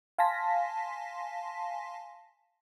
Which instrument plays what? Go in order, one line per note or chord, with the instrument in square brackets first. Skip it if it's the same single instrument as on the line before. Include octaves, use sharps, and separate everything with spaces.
[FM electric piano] F5 G#5 A5 C6 A#6 B6